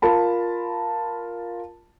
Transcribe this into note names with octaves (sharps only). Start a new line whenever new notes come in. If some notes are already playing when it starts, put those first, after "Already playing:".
F4 A#4 A5 B5